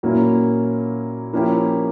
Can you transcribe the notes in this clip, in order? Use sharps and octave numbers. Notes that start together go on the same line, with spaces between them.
A#2 F#3 A#3 C#4 E4
F3 A#3 C#4 E4 G4